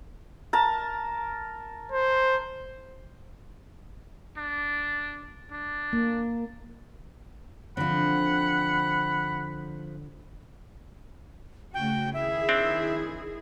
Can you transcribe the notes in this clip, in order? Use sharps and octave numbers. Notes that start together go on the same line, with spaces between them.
A#4 A5
C5
D4
D4
A#3
D3 F3 C4 F#5 B5
C#3 A3 F#4 G5
D#3 E4 G#4 E5
C4 D4